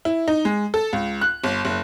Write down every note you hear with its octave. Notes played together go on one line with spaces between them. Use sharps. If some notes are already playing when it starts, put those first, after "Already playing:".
E4
D#4
G#3
A4
C#2
F#6
G1
F#1